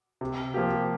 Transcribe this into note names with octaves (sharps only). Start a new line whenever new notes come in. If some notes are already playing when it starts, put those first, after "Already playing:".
C3
F3 A#3 G4